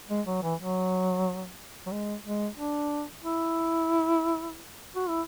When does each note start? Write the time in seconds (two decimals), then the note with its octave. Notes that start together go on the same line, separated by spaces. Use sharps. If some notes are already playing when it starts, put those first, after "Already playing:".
0.10 G#3
0.27 F#3
0.43 E3
0.59 F#3
1.86 F#3
1.92 G#3
2.25 G#3
2.57 D4
3.24 E4
4.96 F#4
5.09 E4